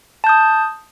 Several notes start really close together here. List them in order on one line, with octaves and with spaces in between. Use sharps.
A5 G6 D#6